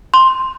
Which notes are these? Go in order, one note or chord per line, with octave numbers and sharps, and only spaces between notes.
C6